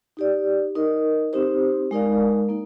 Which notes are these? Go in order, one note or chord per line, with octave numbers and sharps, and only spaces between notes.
D#4 G4 D5
D#4 A#4 D#5
C4 D#4 G4 C5
G#3 D#4 A#4 D5 F5
A#3 D#4